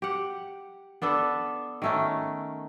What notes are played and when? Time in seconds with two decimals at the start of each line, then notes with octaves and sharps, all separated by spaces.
0.02 G4 F#5
1.02 B3 D4 A4 B4
1.82 D#3 A3 C#4